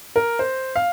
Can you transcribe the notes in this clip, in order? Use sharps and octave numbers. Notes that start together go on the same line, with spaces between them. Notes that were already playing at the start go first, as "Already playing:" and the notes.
A#4
C5
F5